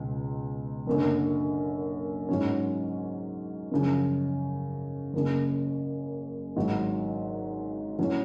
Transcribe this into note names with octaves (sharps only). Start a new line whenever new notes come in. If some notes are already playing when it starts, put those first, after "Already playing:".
Already playing: C#2 B2 G#3
F#1 F#2 D3
G#2 F#3 C#4
F#2 C#3 F3
F#1 F#2 C#3
G#1 G#2 F#3
A2 F#3 C#4